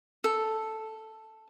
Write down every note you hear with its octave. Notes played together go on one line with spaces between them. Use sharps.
A4